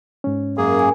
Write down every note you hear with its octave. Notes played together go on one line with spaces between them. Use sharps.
G#2 C#4
F#2 A#3 G#4
A#4 G#5